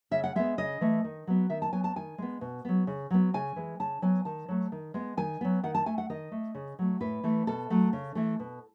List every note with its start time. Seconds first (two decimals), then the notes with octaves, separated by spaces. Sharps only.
0.11 C#3 E5
0.24 F#5
0.35 G#3 B3 E5
0.58 C#3 D#5
0.81 E3 A3
1.04 D#3
1.27 F#3 B3
1.50 D#3 E5
1.62 A5
1.72 F#3 B3 G#5
1.84 A5
1.96 D#3 G#5
2.18 G#3 B3
2.41 B2
2.65 F#3 B3
2.87 C#3
3.10 F#3 B3
3.34 C#3 G#5
3.56 E3 G#3
3.80 C#3 A5
4.02 F#3 B3 G#5
4.25 D#3 A5
4.48 F#3 A3
4.72 D#3
4.94 G#3 B3
5.17 D#3 G#5
5.41 F#3 B3
5.63 D#3 F#5
5.75 A5
5.86 A3 G#5
5.98 F#5
6.10 D#3 D#5
6.32 A3
6.55 C#3
6.79 F#3 A3
7.00 A2 B4
7.23 E3 A3
7.47 B2 A4
7.70 F#3 A3
7.93 C#3
8.15 E3 A3
8.40 B2